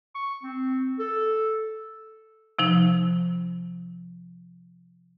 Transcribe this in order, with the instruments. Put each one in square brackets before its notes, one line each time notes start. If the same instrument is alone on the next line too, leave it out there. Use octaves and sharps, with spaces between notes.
[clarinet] C#6
C4
A4
[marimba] C3 F3 D#4